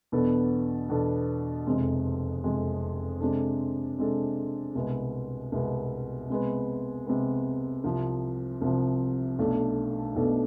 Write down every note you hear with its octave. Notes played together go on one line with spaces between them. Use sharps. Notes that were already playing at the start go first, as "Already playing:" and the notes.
E2 B2 B3 D4 A4
E2 B2 B3 D4 A4
F1 F2 C3 G#3
F1 F2 C3 G#3
C3 G#3 D4 A4
C3 G#3 D4 A4
C2 B2 G#3 B3
C2 B2 G#3 B3
C3 G#3 B3
C3 G#3 B3
C2 C3 F3
C2 C3 F3
B1 B2 A3 D4 A4
B1 B2 A3 D4 A4